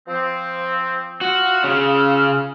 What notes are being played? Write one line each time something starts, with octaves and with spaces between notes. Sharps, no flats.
F3 C4
F4 F#4 E6 F6
C#3